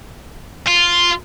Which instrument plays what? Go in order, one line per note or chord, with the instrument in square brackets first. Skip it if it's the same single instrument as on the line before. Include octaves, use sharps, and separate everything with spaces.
[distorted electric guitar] F4